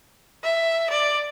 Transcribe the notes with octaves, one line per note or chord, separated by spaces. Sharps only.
E5
D5